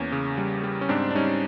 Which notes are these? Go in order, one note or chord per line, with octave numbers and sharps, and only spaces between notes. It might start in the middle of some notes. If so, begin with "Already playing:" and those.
Already playing: E2 A#3 C#4
C#3
G3
G3
C#4
G#2 C4 D4
D4
G3 C#4 D#4